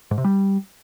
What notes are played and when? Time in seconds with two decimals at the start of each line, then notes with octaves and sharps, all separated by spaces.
0.11 G#2
0.18 C3
0.24 G3